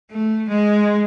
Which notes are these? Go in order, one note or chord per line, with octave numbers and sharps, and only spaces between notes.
A3
G#3